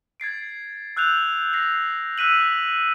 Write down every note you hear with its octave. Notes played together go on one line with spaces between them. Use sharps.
G#6 A6 C7 D7
E6 F#6 G6 F7
A#6 C7 F7
E6 F#6 B6 D#7 F#7